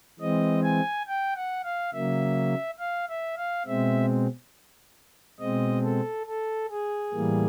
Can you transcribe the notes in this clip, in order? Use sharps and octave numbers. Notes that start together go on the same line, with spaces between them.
E3 G#3 C4 D#5
G#5
G5
F#5
F5
C#3 F#3 A#3 E5
F5
E5
F5
B2 G#3 C4 E5
B2 G#3 C4 D#5
A4
A4
G#4
A2 E3 G3 A#3